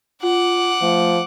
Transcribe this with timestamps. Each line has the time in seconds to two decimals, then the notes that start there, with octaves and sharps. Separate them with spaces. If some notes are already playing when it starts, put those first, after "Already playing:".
0.23 F4 F#5 D6
0.82 F3 A3